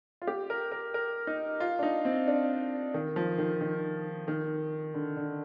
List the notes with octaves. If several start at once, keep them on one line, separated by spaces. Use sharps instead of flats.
F4
G4
A#4
A#4
A#4
D#4
F4
D4
D#4
C4
D4
D#3
F3
D#3
D#3
D#3
D3
D3